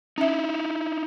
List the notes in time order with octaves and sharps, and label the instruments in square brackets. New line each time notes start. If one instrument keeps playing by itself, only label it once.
[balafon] C#4 E5 [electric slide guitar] D#4 E4